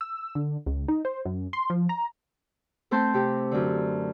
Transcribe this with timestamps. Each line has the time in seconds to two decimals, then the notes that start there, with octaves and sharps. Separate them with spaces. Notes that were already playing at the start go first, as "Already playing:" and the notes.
0.01 E6
0.35 D3
0.66 C#2
0.88 D#4
1.05 C5
1.25 F#2
1.53 C6
1.70 F3
1.89 A#5
2.91 A3 C4 C5 A5 C6 G6
3.14 C3 G4
3.51 F#2 D3